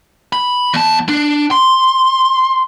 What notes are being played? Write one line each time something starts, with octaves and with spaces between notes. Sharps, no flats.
B5
E2 A5
D4
C6